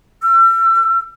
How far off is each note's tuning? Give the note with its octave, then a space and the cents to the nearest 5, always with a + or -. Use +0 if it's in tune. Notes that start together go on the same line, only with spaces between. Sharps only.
E6 +40